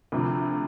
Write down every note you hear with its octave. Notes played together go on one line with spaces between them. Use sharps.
D2 C3 F3